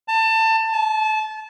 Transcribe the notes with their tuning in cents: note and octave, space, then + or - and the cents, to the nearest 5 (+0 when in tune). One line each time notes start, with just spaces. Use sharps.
A5 +25
A5 -25